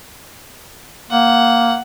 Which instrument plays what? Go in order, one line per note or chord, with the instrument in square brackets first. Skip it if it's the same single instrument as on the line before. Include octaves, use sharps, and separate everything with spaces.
[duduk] A#3 [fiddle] F#5